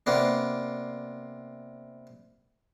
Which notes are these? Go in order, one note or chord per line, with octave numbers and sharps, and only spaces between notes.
C3 A#3 B3 D4